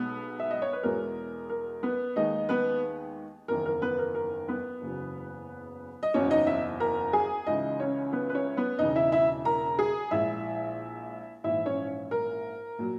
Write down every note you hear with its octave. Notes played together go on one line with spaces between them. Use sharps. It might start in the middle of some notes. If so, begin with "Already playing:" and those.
Already playing: B1 B2 G#3 B3
E5
D#5
C#5
B4
E2 B2 G#3 A#4
A#4
B3 B4
D#2 D#3 G#3 D#4 D#5
B3 B4
F#1 E2 D#3 A#4
A#4
B3 B4
A#4
A#4
B3 B4
F#1 E2 C#3 F#3
D#5
F#1 E2 B2 C#4 C#5
D#4 D#5
E4 E5
A#4 A#5
G#4 G#5
C#2 C#3 E3 G#3 D#4 D#5
C#4 C#5
B3 B4
B4
C#4 C#5
B3 B4
E1 E2 C#3 D#4 D#5
E4 E5
E4 E5
A#4 A#5
G#4 G#5
A#1 A#2 G#3 E4 E5
A#1 G#2 E3 E4 E5
C#4 C#5
A#4
A#2 F#3